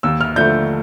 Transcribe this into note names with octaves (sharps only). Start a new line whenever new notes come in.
D#2 E6
F6
D3 F3 A3 G6